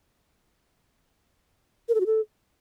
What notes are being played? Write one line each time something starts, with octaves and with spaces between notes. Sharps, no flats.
A#4
A4
F#4
A4